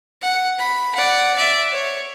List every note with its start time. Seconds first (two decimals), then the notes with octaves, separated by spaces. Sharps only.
0.22 F#5
0.59 B5
0.95 D5 F#5
1.36 D5 E5
1.72 C#5